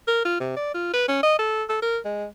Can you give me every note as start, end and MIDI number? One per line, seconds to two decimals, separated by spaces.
0.08 0.24 70
0.25 0.36 65
0.40 0.51 48
0.56 0.70 74
0.74 0.93 65
0.93 1.04 71
1.08 1.19 61
1.23 1.38 75
1.39 1.64 69
1.69 1.77 69
1.82 1.98 70
2.05 2.26 56